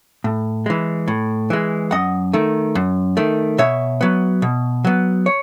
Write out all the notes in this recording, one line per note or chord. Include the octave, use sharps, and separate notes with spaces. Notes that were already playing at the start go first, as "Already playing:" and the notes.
A2
E3 G#3
A2
E3 G#3
F#2 D#5 F#5
D#3 A3
F#2
D#3 A3
B2 C#5 E5
F#3 B3
B2
F#3 B3
C#5